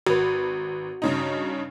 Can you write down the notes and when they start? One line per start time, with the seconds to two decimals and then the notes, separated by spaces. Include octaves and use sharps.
0.07 G#1 F#4 B4
1.02 G2 C#3 D#4